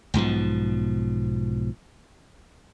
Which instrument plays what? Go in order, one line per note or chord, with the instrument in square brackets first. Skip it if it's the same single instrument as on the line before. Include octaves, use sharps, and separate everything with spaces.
[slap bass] B1 G#2 B2 F3